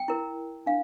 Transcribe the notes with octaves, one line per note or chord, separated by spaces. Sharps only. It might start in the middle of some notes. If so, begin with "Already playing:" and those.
Already playing: G5
E4 A#4
D4 F5